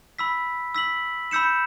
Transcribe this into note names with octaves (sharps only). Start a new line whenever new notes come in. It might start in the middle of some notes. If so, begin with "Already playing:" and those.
B5 E6 B6
E6 B6 F#7
B5 E6 G6 C#7 E7